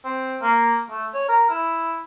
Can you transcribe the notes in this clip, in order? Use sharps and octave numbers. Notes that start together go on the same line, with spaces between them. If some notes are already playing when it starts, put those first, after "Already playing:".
C4
A#3
A3
C#5
A#4
E4